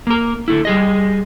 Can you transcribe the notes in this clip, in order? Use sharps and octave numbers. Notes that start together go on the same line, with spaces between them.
A#3 A#4
D3 A3 E4
G3 G#4 D#5